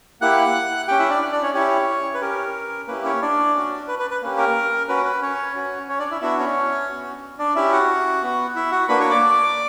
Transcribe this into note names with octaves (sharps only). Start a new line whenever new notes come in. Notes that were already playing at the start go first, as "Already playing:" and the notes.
A#3 E4 G4 F#5 F#6
C#4 G4 G5
E4 E5
D4 D5
D4 D5
C#4 C#5
C#4 E4 G4 C#5
B4
C#4 G4 A#4
A#3 C#4 E4 G4 B4
C#4 C#5
D4 D5
C#4 F#4
B4
B4
B4
A#3 C#4 G4
A#4
C#4 F#4 B4
B4
C#4 C#5
C#4 F#4
C#4 C#5
D4 D5
E4 E5
B3 D4 E4 F#4 E5
C#4 C#5
B3 F#4
D4 D5
C#4 E4 G4 E5
F#4 F#5
B3 F#4
E4 E5
F#4 F#5
A#3 D4 F#4 B4 B5
C#5 C#6
D5 D6